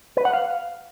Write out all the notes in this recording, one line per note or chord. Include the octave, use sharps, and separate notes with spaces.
B4
F#5
F5